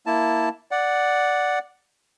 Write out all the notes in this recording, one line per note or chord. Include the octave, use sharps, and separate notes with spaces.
A#3 E4 A5
D5 F#5